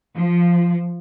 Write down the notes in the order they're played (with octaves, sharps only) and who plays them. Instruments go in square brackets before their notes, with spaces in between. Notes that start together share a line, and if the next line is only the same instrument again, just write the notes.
[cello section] F3